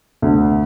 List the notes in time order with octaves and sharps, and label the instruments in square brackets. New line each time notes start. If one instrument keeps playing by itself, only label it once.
[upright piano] D2